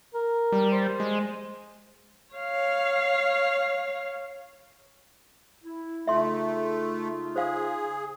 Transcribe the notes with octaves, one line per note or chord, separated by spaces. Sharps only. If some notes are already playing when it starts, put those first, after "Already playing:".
A#4
G3
C5
G#3
C#5 F5
E4
C#3 A3 D#4 F4 E5 C6
G#4 C5 F5